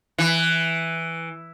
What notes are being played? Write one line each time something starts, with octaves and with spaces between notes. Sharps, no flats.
E3